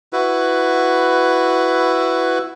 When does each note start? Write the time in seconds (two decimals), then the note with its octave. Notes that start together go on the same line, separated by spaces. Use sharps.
0.13 E4 F#4 B4